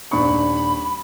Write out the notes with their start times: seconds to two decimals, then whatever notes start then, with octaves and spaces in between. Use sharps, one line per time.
0.11 D#1 D4 B5 C#6